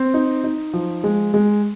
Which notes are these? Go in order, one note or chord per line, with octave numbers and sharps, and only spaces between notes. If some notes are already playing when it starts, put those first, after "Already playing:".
Already playing: C4
D#4
D#4
F3
G#3
G#3